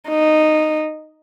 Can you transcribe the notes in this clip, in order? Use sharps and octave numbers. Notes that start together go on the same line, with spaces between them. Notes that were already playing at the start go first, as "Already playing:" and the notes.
D#4